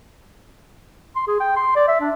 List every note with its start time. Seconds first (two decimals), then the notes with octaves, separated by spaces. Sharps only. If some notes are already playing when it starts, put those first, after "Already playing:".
1.16 C6
1.28 G#4
1.40 G5
1.56 C6
1.76 D5
1.88 E5
2.01 D4